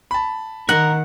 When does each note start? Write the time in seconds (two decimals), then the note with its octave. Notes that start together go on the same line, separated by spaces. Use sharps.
0.11 A5 B5
0.69 D#3 A#4 F#5